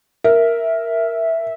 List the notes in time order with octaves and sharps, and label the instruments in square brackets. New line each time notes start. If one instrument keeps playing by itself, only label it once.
[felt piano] A#4 [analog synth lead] E5